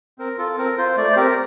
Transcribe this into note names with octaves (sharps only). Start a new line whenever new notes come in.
C4 A#4
F4 A4
C4 A#4
F4 C5
A3 D5
C5
C4 G4 A#4